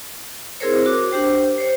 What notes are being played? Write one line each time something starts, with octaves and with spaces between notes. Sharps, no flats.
C4 E4 G#4 A#4 C5 C#5
F#4 A#4 D6
D4 G4 C5 G5
C5 C#5